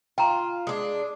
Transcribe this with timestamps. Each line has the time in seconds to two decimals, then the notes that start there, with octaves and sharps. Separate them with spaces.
0.18 F4 G5 A#5
0.67 G#3 D4